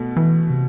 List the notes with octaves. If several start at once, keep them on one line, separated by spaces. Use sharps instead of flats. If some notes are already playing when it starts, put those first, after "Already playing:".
Already playing: B2 A3
E3
C3